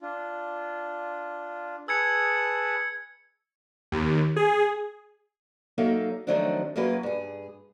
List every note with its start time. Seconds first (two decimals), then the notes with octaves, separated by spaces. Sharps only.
0.01 D4 F4
1.88 G#4 B4 A5 E6 G#6 C#7
3.92 D#2
4.36 G#4
5.78 F#3 A#3 D#4 A4 E5 F5
6.27 D#3 F3 F#3 A3 C4 D4
6.76 F#2 F#3 A#3 F4 G#4 B4
7.03 G2 G#4